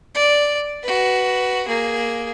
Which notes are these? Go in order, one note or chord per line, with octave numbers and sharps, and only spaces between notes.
D5
F#4 B4
A#3 G#4